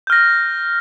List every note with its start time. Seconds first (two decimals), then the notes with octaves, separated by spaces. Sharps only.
0.07 G6
0.10 F6
0.12 A#6